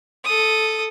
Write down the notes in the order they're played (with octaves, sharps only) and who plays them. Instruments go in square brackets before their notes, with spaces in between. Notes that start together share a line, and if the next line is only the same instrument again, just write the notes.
[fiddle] A4 D#6